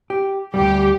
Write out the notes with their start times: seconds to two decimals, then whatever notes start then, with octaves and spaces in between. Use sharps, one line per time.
0.10 G4
0.54 D2 G#2 G3 G4